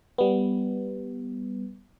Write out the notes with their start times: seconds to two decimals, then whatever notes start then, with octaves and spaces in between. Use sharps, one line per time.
0.18 G3 B3